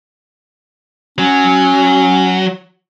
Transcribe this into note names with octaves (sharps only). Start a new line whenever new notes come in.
F#3 C#4